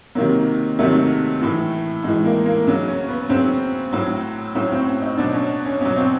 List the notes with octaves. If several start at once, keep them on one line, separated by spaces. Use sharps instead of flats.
C3 D#3 F#3 A#3
C3 D#3 F#3 A3
A2 E3
A2 E3 G#3
A#3
A#3
C#3 F#3
C#4
B3
C#3 F#3 C4
A2 F#3
A2 F#3 C#4
C4
C#4
D#4
B2 F#3 D4
C#4
C#4
B2 F#3 C#4
C4